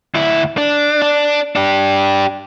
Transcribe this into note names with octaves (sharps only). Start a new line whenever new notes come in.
D2 E4
D4
D4
D4 G4